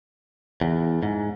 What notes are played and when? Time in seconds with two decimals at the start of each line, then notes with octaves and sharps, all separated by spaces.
0.61 E2
1.03 G#2